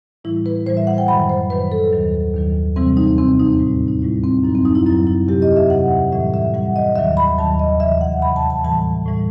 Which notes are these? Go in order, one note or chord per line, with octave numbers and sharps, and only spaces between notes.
A2 E3 G3 E4
B4
A2 E3 G3 C5
E5
F#5
G5
F#2 D#3 F#3 B5
C5
F#2 D#3 F#3 B4
A4
D#2 D#3 F#3
D#2 D#3 F#3
E2 C3 E3 G3 C4
D#4
E2 C3 E3 G3 C4
D#4
A2 G3
D#4
A2 G3 E4
C4
F#2 F#3 D#4
C4
D#4
E4
F#2 F#3 E4
E4
E2 C3 F#3 G4
D#5
E5
E2 C3 F#3 F#5
A2 E3 G3 E5
E5
A2 E3 G3 F#5
D#5
D#2 D#3 F#3 E5
B5
D#2 D#3 F#3 A5
D#5
E2 C3 E3 E5
F#5
E2 C3 E3 B5
A5
A5
A2 E3 G3 A5
A2 E3 G3